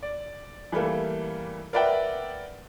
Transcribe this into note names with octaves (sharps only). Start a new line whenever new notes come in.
D5
E3 G3 A3 A#3
A#4 B4 D5 E5 F#5 G5